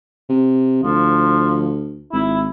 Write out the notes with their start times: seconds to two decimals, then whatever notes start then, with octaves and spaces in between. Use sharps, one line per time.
0.29 C3
0.84 D2 F3
2.13 G#1 E4